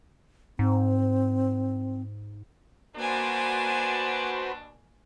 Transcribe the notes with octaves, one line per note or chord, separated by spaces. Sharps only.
G#2 C4
B2 A#3 D4 F#4 B4 C5 G#5